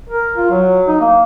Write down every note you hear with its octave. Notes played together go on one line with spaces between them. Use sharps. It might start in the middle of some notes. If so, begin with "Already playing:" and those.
A#4
F4
F#3
D#4
A#3